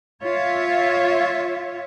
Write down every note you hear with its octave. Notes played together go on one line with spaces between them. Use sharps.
F4 C#5 E5